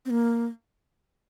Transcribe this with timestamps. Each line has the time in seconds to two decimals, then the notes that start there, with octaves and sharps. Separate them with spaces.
0.05 C4
0.10 A#3